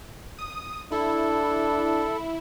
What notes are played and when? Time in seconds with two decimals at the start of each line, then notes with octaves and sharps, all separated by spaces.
0.39 D#6
0.92 D4 E4 A4